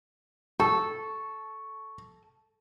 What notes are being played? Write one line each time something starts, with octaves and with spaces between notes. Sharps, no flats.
A4 C#6